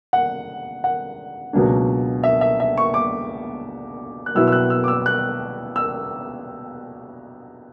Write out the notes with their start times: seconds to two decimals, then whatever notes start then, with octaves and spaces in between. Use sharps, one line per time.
0.13 F#5
0.84 F#5
1.53 C#2 B2 F#3 A#3 D4
2.24 E5
2.41 E5
2.60 E5
2.78 C#6
2.94 D6
4.26 F#6
4.35 B2 F#3 B3 E4 E6
4.47 E6
4.52 F#6
4.70 E6
4.84 D6
4.88 E6
5.06 F#6
5.76 E6